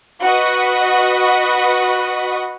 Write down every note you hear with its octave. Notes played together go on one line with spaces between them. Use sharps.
F#4 B4 D#5